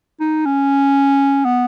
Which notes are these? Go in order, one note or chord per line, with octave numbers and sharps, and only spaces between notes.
D#4
C#4
B3